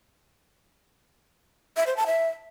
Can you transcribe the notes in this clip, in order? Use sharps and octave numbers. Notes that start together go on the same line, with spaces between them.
E5
C5
A5
E5